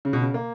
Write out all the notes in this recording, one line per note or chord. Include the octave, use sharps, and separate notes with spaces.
C#3
B2
C#3
A#3